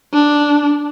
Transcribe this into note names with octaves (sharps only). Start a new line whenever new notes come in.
D4